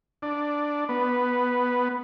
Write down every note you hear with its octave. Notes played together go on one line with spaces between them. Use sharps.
D4
B3